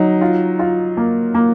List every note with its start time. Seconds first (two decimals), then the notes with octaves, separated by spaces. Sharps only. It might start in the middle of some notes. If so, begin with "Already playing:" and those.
Already playing: F#3 D#4
0.21 F4
0.59 F4
0.97 A#3
1.34 A#3